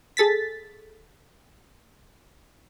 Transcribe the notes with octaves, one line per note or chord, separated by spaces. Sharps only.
G#4 A4 A6 B6